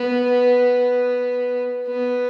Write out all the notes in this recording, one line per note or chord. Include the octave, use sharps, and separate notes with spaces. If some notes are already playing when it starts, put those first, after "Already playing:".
Already playing: B3
B3